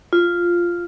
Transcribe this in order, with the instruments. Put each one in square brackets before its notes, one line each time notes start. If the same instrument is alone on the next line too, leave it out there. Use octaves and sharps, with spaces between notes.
[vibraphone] F4